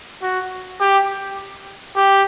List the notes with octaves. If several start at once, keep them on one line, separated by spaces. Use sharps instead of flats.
F#4
G4
G4